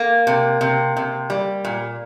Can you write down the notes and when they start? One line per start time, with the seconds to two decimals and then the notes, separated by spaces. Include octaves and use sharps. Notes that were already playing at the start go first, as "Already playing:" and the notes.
Already playing: A#3
0.27 C3
0.61 C3
0.97 C3
1.30 G3
1.65 A#2